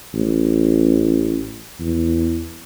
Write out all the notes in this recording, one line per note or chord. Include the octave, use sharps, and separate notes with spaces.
A1
E2